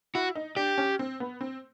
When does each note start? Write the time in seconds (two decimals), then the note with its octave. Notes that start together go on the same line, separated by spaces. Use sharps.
0.15 E4 F#4
0.35 D#4
0.56 D4 G4
0.78 C#4
0.99 C4
1.20 B3
1.41 C4